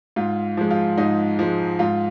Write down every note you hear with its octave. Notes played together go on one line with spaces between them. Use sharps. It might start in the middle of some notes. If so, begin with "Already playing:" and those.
G#2 F4
F3 G#3
F4
G#2 D#4
F3 G#3
G#2 F4